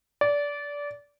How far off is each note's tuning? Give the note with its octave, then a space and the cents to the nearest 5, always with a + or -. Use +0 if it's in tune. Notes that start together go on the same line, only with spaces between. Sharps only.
D5 -20